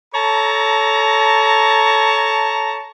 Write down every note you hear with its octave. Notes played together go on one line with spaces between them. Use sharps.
A4 C#5 A5 A#5